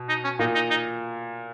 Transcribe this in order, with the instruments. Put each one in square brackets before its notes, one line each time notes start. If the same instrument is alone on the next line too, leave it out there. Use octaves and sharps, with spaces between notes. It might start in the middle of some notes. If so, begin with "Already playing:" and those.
Already playing: [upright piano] B2
[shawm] D#4
C#4
[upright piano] A#2 [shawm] D#4
[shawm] D#4
D#4